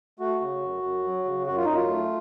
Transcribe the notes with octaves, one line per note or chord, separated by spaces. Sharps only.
A3 F#4
C#3
F#2
F#2
F#3
C#3
F#2 F#4
F4
F#2 D#4
F4
A3